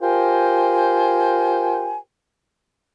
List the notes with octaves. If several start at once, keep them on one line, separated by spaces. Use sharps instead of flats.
F4 G4 A#4 C5 G5 G#5